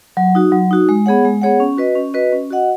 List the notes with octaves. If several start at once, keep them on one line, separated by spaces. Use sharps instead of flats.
F#3
D#4 F#4
F#3
D#4 F#4
G#3
B3 G#4 C#5 F#5
G#3
B3 G#4 C#5 F#5
C#4
F#4 B4 D#5
C#4
F#4 B4 D#5
C#4
F#4 D#5 F#5